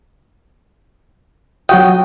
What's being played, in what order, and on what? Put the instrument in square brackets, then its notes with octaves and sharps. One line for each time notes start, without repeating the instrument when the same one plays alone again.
[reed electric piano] F#3 F#4 D#6 [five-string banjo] G5